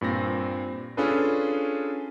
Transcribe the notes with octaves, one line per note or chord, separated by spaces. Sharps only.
G2 A#2 C4 A#6
C#4 D4 F4 G#4 A4 B4